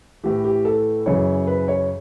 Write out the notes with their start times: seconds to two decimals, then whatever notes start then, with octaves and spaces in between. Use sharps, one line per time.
0.24 A2 E3 G4
0.44 G4
0.65 A4
1.06 F#2 C#3 E3 C#5
1.47 B4
1.68 C#5